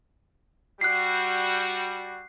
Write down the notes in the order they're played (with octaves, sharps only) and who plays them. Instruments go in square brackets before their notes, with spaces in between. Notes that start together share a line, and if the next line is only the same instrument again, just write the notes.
[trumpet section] G3 F#4 [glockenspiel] F#6 C7